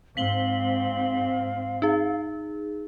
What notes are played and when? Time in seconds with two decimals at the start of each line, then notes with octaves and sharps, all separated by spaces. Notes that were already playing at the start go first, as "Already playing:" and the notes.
0.17 G#2 C4 F5 B6 F#7 G7
1.82 D#4 G#4